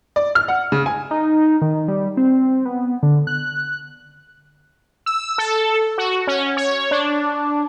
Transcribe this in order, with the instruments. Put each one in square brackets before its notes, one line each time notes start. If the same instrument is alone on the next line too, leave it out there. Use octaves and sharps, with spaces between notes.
[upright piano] D5
F6
F#5
C#3
G#5
[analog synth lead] D#4
D#3
G3
C4
B3
D3
F#6
[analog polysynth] E6
A4
F#4
C#4
C#5
D4